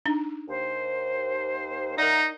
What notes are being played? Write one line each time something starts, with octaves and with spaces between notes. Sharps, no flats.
D4 D#4
D#2 C5
D#4 A#4 D5 E5 F#5 A#5